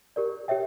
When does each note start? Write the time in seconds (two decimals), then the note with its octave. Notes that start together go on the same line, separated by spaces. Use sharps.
0.16 G4 A#4 D5
0.48 G4 C#5 E5 G5